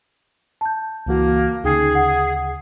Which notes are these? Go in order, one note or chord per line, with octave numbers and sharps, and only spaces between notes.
A5 G6
C#2 E3 A#3 F#4
D2 C#3 D#4 G#4 G5 C7
F#5